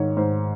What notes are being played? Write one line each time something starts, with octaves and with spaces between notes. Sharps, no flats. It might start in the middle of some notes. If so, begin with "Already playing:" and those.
Already playing: G#2 D#3 C#5
G#2 C5